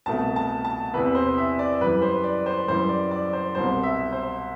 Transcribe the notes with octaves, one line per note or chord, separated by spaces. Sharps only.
C2 B2 A3 A5
A5
A5
E2 C3 E3 B4
C5
E5
D5
F#2 E3 G3 B4
C5
D5
C5
F#2 E3 G3 C5
D5
D5
C5
C2 B2 G3 C5
E5
C5